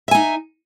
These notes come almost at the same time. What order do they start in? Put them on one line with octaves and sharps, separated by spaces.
E5 G#5 D#4